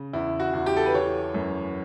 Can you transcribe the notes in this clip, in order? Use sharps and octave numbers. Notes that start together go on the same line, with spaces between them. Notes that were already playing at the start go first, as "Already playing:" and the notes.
Already playing: C#3
E2 E4
F#4
E2
G4
A4
B4
E3 C#5
F#2